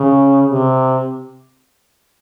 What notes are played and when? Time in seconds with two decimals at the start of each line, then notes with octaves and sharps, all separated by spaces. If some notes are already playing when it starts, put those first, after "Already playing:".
Already playing: C#3
0.49 C3